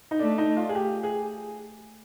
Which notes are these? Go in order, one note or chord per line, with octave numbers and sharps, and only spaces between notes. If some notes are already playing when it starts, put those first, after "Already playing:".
D#4
A3 D4
D#4
F4
G#4
G4
G#4